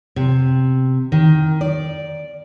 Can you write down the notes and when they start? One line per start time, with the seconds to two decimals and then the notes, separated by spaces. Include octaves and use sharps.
0.16 C3
1.12 D#3
1.61 D5